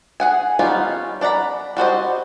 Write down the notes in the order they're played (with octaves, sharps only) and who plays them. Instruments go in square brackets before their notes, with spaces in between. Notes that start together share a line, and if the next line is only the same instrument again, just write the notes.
[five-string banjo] G#4 F#5 G#5
G3 B3 C#4 D#4 F4
D4 D5 F#5 A#5 B5
G3 F#4 C5 D#5